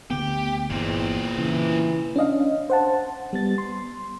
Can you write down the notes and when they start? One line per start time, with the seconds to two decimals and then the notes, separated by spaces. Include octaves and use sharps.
0.10 D2 D3 B3 G4
0.70 G1 E2 A#2 C4
1.38 C#3 E3
2.16 C#4 D4 D#5 F5
2.70 C5 F#5 A5
3.33 G3 B3 A6
3.58 C6